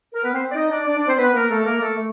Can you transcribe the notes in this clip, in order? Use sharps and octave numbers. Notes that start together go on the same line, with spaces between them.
A#4
B3 B4
C4 C5
D5
D#4 D#5
D4 D5
D4 D5
D4 D5
C4 C5
B3 B4
A#3 A#4
A3 A4
A#3 A#4
A3 A4
A3